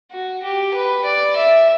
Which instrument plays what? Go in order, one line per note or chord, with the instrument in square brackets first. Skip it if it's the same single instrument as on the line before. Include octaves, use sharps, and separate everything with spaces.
[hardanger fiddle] F#4
G4
B4
D5
E5